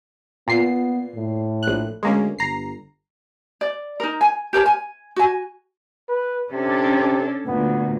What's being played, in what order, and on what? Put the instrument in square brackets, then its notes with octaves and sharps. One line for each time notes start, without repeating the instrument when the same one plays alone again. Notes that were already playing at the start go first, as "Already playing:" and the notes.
[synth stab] A#2 C7 [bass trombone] B3
[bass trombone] A2
[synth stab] A#1 F#6
[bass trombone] D2 [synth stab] G#3 A#3 C#4
[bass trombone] G1 [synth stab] A#5 C7
[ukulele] D5
D#4 A#4
G#5
G4 A#4 C#5 A5
G#5
F#4 G#5
[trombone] B4
[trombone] C3 [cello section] C#4 D4 A4
[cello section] D2 A#2 [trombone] B3